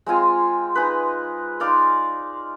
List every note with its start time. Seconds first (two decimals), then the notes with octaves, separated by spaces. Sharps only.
0.06 G#3 C4 F4 G#5
0.75 D#4 G#4 B4
1.60 D#4 D5 F5 C6